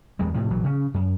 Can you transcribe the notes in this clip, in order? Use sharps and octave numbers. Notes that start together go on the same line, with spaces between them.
E2 G3 G#3
A2 C3 F3
A#1 E3 F#3
C#3 C#4
F#2